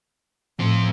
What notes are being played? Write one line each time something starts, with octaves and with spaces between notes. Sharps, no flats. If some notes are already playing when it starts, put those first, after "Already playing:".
A2 F3 C4